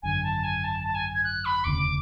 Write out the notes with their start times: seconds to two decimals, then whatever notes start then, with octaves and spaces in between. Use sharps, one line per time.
0.03 G#1 F#2 D3 G#5
0.24 A5
0.44 G#5
0.64 A5
0.85 A5
0.95 G#5
1.14 G#6
1.24 F#6
1.45 B5
1.64 E1 D2 C#3 D6